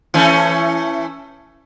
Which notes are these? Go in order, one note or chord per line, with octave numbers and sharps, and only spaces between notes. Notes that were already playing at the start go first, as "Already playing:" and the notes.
E3 A3 C#4